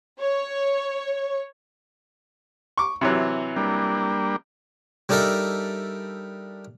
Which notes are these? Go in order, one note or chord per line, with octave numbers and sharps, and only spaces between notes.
C#5
C#6 D6
C3 E3 F#3
G3 A#3 D4
G3 D4 D#4 A4 A#4 E5